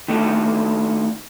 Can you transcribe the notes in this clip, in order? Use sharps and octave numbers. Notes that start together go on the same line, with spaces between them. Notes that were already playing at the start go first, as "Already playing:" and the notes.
D#3 A3 D4 A4